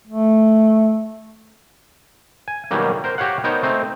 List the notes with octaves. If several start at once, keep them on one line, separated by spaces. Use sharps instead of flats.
A3
G#5
B2 D#3 F#3 G3 A#3
A#4 C5
F#4 G4 C#5 F5 F#5
B3 D#4 A#4 C5 C#5
A3 C4 D#4